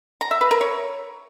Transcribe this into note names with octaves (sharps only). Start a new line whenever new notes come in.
A#5
E5
B4
A#4
C#5